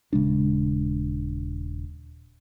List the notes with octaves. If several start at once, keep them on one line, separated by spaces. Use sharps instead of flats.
D#1 C#3 G#3 D4